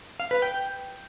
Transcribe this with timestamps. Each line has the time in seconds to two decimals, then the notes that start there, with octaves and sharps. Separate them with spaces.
0.20 F5
0.31 B4
0.42 G5